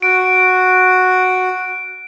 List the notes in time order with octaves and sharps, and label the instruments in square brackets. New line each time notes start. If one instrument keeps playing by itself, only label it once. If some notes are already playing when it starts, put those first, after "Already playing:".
[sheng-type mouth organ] F#4 [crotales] D7